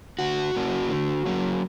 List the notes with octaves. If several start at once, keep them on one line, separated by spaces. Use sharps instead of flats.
D3 F#4
F#3 A#3 C#4
D3
F#3 A#3 C#4